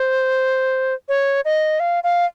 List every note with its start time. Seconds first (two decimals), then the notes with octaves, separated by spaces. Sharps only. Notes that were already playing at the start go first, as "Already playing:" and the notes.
Already playing: C5
1.09 C#5
1.45 D#5
1.80 F5
2.04 F5